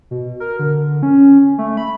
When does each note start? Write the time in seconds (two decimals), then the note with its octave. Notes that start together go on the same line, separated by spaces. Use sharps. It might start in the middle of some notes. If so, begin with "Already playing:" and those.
0.11 B2
0.40 A#4
0.59 D3
1.03 C#4
1.58 A3
1.77 B5